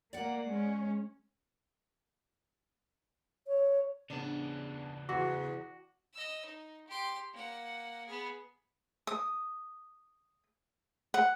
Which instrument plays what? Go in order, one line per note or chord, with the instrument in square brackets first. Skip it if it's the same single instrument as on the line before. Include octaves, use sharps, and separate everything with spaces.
[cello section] A#3 [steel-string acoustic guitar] D5 F#5
[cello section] G#3 C#4
[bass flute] C#5
[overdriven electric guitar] C#3 B3 [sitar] D4
[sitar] E2 [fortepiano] F#4
[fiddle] D#5 E6
D#4
G4 C6
A#3 F#5
B3 G#4
[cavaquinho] D#6
F#5